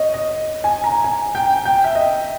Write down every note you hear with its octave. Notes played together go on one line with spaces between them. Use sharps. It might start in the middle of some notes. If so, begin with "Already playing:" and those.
Already playing: C#5 D#5
D#5
G#5
A#5
G#5
G5
G5
E5
D#5